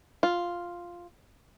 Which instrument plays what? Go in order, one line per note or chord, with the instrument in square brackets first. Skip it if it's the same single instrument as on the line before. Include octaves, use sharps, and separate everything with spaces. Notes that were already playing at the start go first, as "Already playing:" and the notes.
[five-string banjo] F4